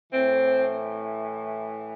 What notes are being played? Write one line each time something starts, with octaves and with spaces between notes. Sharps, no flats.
A2 E3 C4